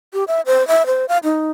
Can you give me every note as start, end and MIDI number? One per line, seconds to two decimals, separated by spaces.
0.13 0.24 67
0.28 0.41 76
0.46 0.66 72
0.68 0.86 76
0.86 1.05 72
1.09 1.18 77
1.24 1.52 63